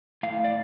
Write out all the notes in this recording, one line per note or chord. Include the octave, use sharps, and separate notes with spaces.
A2 F5
D5